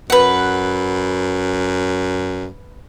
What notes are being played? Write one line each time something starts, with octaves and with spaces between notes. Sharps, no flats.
F#2 B4 F#5